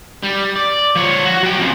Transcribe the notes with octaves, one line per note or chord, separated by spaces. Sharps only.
G3
D5
F3 C#5
F#4
F#3 G5
F2 C#3